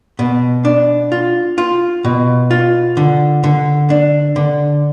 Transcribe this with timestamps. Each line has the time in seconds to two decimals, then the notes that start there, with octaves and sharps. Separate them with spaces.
0.19 B2
0.65 D4
1.12 F4
1.58 F4
2.04 B2
2.51 F4
2.97 D3
3.44 D3
3.90 D4
4.36 D3